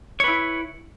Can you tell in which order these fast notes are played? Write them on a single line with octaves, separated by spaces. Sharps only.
C#5 B4 E4